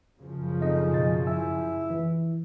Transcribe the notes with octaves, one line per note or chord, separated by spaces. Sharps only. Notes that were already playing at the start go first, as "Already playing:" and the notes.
F#2 C#3 F3
C4 D#4 A4 D#5
B2 A6
E4 G#5 E6
E3